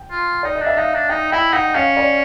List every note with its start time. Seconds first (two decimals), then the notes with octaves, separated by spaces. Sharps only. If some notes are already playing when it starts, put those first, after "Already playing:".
Already playing: G5
0.11 F4
0.43 D#4 D5
0.55 D#5
0.61 D4
0.66 E5
0.77 D#4 F5
0.94 D4
1.09 D#4 G5
1.32 E4 G5
1.53 D#4 F#5
1.75 C#4 F5
1.97 D5